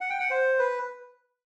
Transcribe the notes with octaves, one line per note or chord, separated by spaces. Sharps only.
F#5
G5
F#5
C5
B4